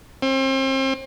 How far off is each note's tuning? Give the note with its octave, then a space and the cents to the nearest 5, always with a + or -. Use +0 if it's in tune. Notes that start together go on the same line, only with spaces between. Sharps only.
C4 +35